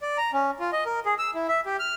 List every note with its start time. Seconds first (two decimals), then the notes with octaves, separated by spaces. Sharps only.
0.02 D5
0.18 A#5
0.33 C#4
0.59 F4
0.73 D#5
0.86 A#4
1.05 G#4
1.18 E6
1.34 E4
1.48 E5
1.66 G4
1.79 F6